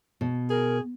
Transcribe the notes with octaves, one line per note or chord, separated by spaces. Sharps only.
B2
G#4 A#4